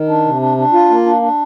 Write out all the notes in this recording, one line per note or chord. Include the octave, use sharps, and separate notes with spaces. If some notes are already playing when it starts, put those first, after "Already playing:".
Already playing: D#3
D4
C3
D4
D4
F4
A#3
D4
D4